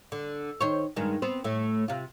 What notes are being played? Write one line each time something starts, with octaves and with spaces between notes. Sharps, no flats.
D3
D#3 C5 C#5
G2 D#3 G#3
B3 C4 C5
A2 A3
C3 F4